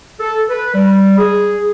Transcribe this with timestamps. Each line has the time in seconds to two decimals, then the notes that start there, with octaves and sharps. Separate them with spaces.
0.20 A4
0.49 B4
0.74 G3
1.18 G#4